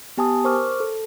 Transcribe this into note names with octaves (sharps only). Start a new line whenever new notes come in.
B3 G4 G#5 A5 D#6
A#4 C5 C#6 D6 F6
A4